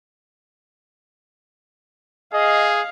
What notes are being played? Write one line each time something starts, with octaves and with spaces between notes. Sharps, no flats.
G#4 D#5 F5